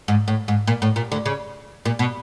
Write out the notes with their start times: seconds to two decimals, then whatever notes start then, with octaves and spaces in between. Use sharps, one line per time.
0.08 G#2
0.28 A2
0.48 G#2
0.67 A#2
0.82 A2
0.96 A#2
1.12 D2 D3
1.26 C#3
1.85 A#2
1.99 B2